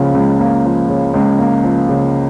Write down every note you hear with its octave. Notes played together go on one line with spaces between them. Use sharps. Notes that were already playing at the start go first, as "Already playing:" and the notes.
Already playing: C#2 C#3 F3 A#3
C#2
A#3
F3
C#3
C#2
A#3
F3
C#3